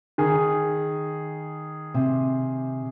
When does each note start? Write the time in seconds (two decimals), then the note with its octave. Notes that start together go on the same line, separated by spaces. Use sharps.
0.18 D#3 G#4
1.94 C3